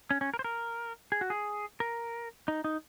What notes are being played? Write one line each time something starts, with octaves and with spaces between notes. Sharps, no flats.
C#4
C#4
A#4
C5
A#4
G#4
F#4
G#4
A#4
D#4
D#4